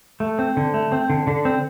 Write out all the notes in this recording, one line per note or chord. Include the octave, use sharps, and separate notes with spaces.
A3
C4
D3
A3
C4
D3
D3
C4